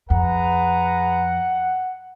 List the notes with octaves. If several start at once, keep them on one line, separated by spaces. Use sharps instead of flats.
F2 G#4 B4 F#5 A#5